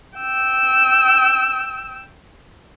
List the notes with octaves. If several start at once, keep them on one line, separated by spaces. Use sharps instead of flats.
G5 E6